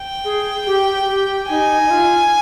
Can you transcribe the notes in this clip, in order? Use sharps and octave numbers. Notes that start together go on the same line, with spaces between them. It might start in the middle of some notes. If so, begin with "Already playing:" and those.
Already playing: G5
G#4
G4
G4
D#4 G#5
D#4
F4